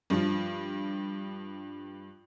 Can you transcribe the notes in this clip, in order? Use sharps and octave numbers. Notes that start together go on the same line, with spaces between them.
G2 F3